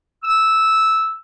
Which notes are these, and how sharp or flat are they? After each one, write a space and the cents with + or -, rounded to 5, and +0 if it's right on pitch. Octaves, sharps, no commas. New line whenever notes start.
E6 -10